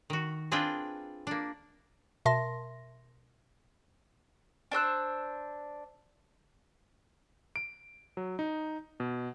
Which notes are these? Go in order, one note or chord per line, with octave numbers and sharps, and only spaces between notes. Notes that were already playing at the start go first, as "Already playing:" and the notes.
D#3 F#4
C4 D4 F4 G#4 B4 G5
A#3 D4
B2 A#4 E5 A5 C6 A#6
D4 C5 E6 F#6
D7
F#3
D#4
B2